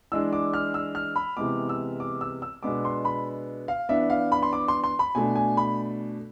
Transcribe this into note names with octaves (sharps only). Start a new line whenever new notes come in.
E3 G#3 D4 E6
D6
F6
E6
F6
B5
C3 E3 G#3 B3 D6
E6
D6
E6
E6
B2 G#3 B3 D4 D6
C6
B5
F5
E3 B3 D4 E5
F5
B5
C6
D6
C6
C6
B5
B2 A3 D4 G#5
G#5
B5